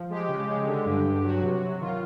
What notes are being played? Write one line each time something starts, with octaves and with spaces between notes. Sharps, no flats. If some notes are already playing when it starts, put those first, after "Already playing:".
Already playing: F3
G#3 G4
C#3
G#3
D3
G2
G2
F#3 F#4
C3
F#4
F#3
D#3 F4